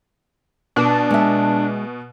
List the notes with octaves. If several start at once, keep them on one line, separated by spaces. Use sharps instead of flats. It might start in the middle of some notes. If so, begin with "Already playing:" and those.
B2 D4
G#3 E5